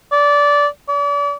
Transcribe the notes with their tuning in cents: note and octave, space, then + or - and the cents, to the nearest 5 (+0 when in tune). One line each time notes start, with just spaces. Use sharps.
D5 -20
D5 -40